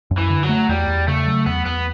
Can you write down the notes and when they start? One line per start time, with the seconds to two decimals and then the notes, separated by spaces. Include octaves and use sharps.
0.11 F#2
0.18 E3
0.30 D3
0.43 F#3
0.49 A3
0.69 E2 G3
0.88 E2
1.08 C#3 A3
1.26 F#3
1.46 E2 B3
1.65 E2 B3